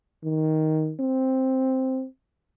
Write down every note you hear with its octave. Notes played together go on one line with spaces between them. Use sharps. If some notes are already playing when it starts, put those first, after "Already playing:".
D#3
C4